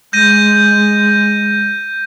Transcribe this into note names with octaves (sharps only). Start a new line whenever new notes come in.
G#3 G6 A#6 D#7